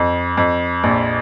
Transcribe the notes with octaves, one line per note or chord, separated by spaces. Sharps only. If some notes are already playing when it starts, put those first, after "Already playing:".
Already playing: F2
F2
A#1